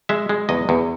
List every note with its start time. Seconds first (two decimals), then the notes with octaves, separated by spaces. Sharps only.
0.09 G#3 E5
0.29 G#3
0.49 E2 D#5
0.69 E2